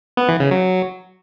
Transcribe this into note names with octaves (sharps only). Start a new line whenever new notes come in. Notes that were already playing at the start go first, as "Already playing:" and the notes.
B3
E3
C#3
F#3